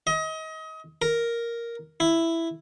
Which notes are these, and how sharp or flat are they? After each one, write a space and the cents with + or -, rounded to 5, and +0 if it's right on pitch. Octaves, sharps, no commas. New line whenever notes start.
D#5 +30
A#4 +0
E4 +5